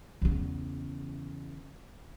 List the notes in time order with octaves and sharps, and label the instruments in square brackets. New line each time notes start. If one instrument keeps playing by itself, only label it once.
[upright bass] E2 C#3